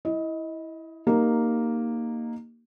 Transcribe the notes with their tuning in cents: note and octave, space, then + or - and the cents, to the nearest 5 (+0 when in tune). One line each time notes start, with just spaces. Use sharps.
E4 -10 D#5 +20
A#3 +0 D#4 -10 G4 +0